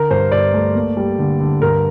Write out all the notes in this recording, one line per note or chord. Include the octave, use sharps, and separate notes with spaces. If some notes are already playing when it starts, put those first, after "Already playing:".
Already playing: D3 A#4
G2 C5
G2 D5
A3
A#3
G3
D3
D3
G2 A#4